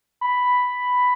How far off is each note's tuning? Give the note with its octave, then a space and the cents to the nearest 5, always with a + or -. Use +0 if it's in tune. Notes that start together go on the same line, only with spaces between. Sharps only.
B5 +5